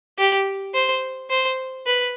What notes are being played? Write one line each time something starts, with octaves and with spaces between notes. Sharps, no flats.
G4
C5
C5
B4